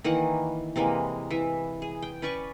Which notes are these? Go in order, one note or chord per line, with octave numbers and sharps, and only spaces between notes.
D#3 E3 A#3 F#5
C3 E3 G#3 A#3
E3 E5
G#4
G5
C#4 B4 D5 C#6